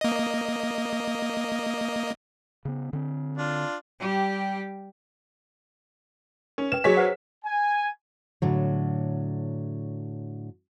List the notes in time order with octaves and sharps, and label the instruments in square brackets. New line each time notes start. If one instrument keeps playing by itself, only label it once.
[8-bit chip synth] A#3 D#5
[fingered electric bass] C#3 B3
D3 C4
[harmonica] D4 F4
[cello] G3 G4
[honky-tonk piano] C#4 [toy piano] A#4
[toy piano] B4 G5 [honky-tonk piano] E7
[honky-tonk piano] F#3 C#5 B6 [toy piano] G#4 D#5 G#5
[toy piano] B4 C5 F#5
[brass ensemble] G#5
[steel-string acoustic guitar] A2 D3 F#3